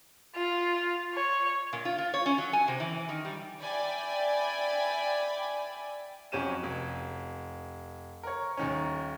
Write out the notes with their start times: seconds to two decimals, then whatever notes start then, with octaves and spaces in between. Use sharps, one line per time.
0.35 F4
1.14 C#5
1.73 A#2
1.85 F4
1.98 F4
2.14 C#5
2.26 C#4
2.38 F#3
2.53 G#5
2.68 C3
2.80 E3
3.09 D#3
3.25 G3
3.61 D5 E5 G5 G#5 B5
6.32 F2 F#3 C#4 G4 D#7 E7
6.63 F1
8.23 A#4 C#5
8.57 D#1 D#3 C#4